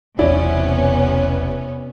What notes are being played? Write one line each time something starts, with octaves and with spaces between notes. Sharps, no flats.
E1 B1 E2 C3 B3 C#4 E4 D5